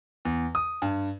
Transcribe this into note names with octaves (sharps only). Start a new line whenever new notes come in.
E2
D#6
G2